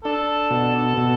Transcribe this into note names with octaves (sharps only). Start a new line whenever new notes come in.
D4 A4
B2
B2